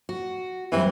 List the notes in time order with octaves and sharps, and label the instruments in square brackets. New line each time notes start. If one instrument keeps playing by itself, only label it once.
[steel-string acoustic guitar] F#4
[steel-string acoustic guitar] F#2 G3 C4 [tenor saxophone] E3